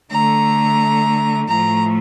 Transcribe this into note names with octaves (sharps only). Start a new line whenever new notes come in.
D3 A3 A#5
A2 F3 A3 A#5